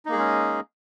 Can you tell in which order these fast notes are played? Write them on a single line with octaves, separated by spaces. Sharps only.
D#4 A#3 G#4 G#3 C#4